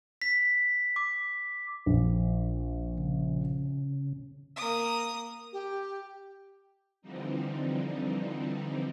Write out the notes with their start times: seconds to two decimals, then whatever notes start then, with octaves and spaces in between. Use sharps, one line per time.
0.22 B6
0.96 D6
1.86 A#1
2.98 C#3
4.56 A#3 D#6
5.53 G4
7.02 D3 E3 F3 G3 C4 D#4